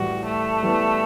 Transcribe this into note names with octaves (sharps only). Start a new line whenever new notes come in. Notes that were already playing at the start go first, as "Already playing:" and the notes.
Already playing: A2 E3 G3 F#4
A3
E3 G3 B3